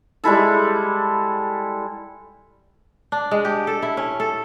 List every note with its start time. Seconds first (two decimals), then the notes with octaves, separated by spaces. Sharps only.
0.24 G3 G#3 E4 A4
3.12 D4
3.31 G#3
3.45 G4
3.67 A4
3.82 E4
3.97 C#4
4.20 A4